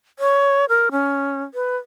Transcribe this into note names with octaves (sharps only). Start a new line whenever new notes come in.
C#5
A#4
C#4
B4